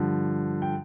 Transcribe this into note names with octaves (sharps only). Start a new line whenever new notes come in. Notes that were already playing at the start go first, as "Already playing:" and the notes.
Already playing: G2 D3 F3
G5